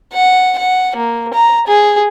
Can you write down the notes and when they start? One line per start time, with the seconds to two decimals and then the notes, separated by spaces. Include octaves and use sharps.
0.13 F#5
0.58 F#5
0.96 A#3
1.33 A#5
1.67 G#4